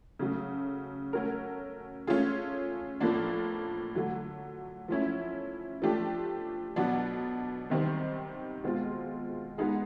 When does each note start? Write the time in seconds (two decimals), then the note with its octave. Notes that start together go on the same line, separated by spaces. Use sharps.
0.19 C#3 F#3 A3
1.13 A3 C#4 F#4 A#4
2.07 A3 C#4 F4 G#4
3.00 A2 F3 A#3 D4
3.95 D3 F#3 A3
4.88 F3 A3 C#4 E4
5.82 F3 A3 D4 G4
6.76 B2 F#3 B3 D4
7.70 C3 D#3 G3 C4
8.63 B2 G#3 C4 F4
9.58 G#3 B3 D#4 G#4